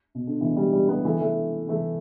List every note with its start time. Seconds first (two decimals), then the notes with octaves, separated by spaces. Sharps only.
0.15 B2
0.27 D3
0.41 B2 E3
0.57 D3 G3
0.73 D3 G3
0.89 G3 B3
1.05 E3 A3
1.21 E3 A3
1.68 E3 A3